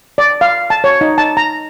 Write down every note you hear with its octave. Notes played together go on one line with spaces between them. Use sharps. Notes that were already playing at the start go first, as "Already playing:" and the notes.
D5
F5
A5
C#5
D#4
A5
A#5